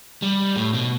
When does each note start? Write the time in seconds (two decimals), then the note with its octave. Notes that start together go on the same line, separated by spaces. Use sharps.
0.22 G3
0.56 A2
0.74 B2